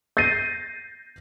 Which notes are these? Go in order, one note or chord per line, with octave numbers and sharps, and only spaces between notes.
G6 A6 A#6 C7 D#7